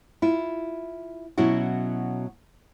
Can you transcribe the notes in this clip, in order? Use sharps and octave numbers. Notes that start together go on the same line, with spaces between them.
E4 F4
B2 F#3 C#4 E4 F#4